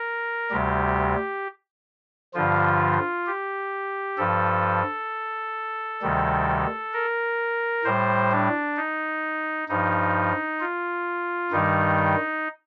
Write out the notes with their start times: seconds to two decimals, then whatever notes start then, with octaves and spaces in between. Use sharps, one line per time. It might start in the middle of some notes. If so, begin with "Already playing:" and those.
Already playing: A#4
0.51 D2 C3 G3 G4
2.34 G2 D3 F3 F4
3.27 G4
4.17 G2 F3 A4
6.02 D2 C3 D#3 G3
6.93 A#4
7.85 A2 G3 C5
8.31 D4
8.77 D#4
9.68 G2 F3 D#4
10.61 F4
11.51 G2 D#3 G3 D#4